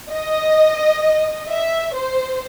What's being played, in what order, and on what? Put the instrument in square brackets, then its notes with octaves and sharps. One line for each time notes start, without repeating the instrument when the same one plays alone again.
[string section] D#5
E5
C5